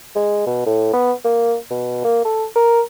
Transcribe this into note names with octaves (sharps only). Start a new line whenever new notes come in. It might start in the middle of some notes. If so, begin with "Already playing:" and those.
G#3
B2
A2
B3
A#3
B2
A#3
A4
A#4